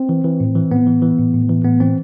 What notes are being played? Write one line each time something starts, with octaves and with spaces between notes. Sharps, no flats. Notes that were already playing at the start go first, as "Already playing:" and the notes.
Already playing: C4
E3
E3
A2
E3
A2 B3
E3
E3
A2
A2
E3
A2 B3
E3 C4